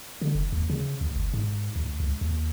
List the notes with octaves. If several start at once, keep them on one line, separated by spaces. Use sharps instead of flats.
D3
F1
D#2
C#3
D2
G1
G#2
D2
C#2
D#2